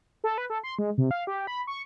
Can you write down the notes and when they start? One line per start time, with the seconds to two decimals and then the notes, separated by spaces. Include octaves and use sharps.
0.24 A4
0.38 B4
0.50 A4
0.64 C6
0.79 G#3
0.98 C3
1.11 F5
1.27 G4
1.47 B5
1.67 C#6